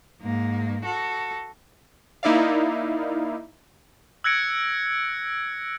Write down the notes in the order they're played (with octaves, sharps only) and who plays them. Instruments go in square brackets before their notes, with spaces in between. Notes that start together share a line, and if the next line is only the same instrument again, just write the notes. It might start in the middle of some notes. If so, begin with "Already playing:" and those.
[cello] G#2 A#3
F#4 A4
[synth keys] A#3 D#4 E4 D5 F5
[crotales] E6 F#6 G#6 A#6 C#7 D7